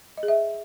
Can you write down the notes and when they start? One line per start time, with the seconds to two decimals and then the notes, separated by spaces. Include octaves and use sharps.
0.18 D#5
0.23 G#4
0.28 E5